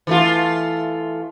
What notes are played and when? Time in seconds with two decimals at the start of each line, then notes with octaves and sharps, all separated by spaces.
0.07 E3 A3 F4